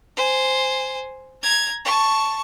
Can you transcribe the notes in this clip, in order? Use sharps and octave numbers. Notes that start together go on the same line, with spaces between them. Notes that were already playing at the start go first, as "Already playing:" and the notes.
C5 G#5
A#5 G#6
A5 C#6